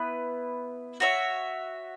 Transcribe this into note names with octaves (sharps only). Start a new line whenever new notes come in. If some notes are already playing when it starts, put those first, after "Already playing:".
Already playing: B3 E4 B4
F#4 C#5 E5